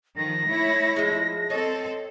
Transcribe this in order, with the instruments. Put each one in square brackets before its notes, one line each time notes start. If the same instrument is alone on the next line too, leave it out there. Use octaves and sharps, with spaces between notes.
[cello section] D#3 F3 [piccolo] A#6
[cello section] A3 E4 C#5
[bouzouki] F3 G#3
[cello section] C4 A4 [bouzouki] C#5 D#5